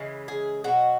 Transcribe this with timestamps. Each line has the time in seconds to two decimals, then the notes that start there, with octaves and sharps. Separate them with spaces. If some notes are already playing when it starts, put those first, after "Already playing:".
Already playing: C#3 E3 G#3
0.28 G#4
0.64 B2 F#3 F#4